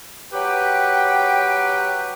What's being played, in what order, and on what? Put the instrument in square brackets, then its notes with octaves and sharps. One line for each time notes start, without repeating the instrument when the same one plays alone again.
[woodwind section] F#3 G4 B4 G5